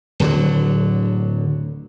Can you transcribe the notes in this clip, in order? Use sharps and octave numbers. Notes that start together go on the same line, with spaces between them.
D1 D3 F#3